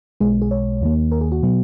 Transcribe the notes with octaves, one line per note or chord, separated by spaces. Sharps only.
B1 B2 G#3 G#4
G#4
C#5
D#2 D#3 A#3
A#4
G#4
F#4
B2 F#3 B3